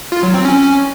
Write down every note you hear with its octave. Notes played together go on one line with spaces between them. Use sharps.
F4
F#3
C4
C#4